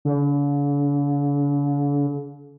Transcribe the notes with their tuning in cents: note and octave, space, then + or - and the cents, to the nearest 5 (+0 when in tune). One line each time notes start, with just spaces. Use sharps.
D3 -45